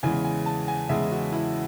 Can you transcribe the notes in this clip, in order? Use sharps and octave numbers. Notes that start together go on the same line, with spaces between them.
E2 C#3 E3 G#3 G#5
G#5
A5
G#5
E2 C#3 E3 G#3 E5
F#4
E4